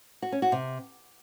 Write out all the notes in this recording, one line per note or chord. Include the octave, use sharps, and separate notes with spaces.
F#4
C#4
F#4
C3